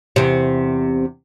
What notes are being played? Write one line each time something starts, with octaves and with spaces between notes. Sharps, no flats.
E2 C3